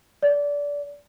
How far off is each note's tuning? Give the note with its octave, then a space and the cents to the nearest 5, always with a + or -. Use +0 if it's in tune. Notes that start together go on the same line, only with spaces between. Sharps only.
D5 -25